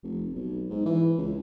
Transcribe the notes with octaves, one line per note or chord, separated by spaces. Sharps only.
F1
B1
G#2
E3
C#2